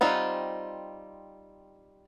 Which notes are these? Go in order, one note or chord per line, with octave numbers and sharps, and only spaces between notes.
G3 C4 D#4 F4 F#5